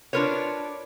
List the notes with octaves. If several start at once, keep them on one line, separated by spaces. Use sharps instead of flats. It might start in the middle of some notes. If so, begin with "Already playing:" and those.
D4 F4 A#4 B4 C#5